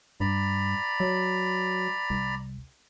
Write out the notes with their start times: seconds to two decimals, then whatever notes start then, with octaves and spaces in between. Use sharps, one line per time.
0.20 G2 D5 A#5 B5
1.00 F#3
2.10 C2